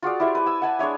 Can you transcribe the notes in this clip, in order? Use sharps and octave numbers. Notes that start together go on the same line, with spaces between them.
F4 F#4 G#4 D5
E4 G4 C5 E5
B4 G#5
G#5 E6
F#5 G#5 A5
G#3 D4 C#5 E5